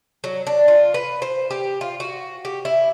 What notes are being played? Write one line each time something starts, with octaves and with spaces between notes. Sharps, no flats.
F#3
D4
F4
B4
C5
G4
F4
F#4
G4
E4